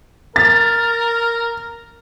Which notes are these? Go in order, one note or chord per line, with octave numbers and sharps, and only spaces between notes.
A#4 A6